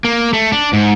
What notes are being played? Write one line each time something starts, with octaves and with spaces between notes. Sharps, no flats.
A#3
A3
D4
G#2